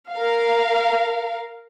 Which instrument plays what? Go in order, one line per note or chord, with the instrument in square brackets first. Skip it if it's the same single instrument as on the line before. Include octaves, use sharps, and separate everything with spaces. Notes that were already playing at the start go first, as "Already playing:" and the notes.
[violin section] A#4 F5